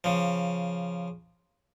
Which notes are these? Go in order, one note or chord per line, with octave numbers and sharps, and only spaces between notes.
C#3 F3